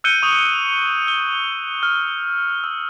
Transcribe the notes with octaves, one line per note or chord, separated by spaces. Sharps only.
E6 F#6 G6 C#7 D#7 G7
C#6 D#6 F7 F#7
E6 G7
F6
E6